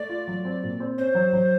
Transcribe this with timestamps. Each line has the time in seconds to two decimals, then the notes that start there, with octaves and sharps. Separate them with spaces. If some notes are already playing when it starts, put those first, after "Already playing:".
Already playing: A3 D5
0.09 F4
0.28 F#3
0.45 C4
0.63 A#2
0.80 C4
0.98 C#4 C5
1.15 F#3
1.33 F#3